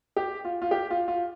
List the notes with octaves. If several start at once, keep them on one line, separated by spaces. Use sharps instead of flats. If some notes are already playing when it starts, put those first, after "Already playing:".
G4
F4
F4
G4
F4
F4